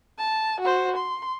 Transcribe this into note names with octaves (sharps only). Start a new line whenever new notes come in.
A5
F#4 C5
C6